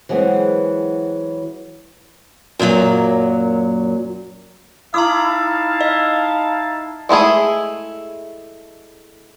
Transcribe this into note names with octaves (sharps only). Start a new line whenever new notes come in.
E3 F#3 G#3 B3 C4
F#2 A#2 D3 F#3
D#4 E4 F5 A5 A#5 D6 D#6
D#5
G#3 A3 E4 G#4